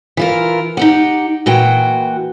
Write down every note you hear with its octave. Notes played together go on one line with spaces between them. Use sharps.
E3 F4 A#4
D#4 G4 F#5
A#2 E3 F#4 G5